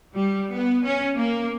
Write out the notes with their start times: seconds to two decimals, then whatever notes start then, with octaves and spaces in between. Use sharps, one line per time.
0.15 G3
0.53 B3
0.85 C#4
1.16 A#3